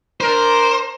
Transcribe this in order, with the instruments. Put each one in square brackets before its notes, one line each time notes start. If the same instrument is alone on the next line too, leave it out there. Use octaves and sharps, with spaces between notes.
[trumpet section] D4 A#4 [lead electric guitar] C5